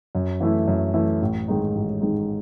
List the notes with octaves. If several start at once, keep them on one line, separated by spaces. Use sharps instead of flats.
F#2
E3 A3 E4
F#2
E3 A3 E4
A1
G#2 D#3 G#3 D#4
A1
G#2 D#3 G#3 D#4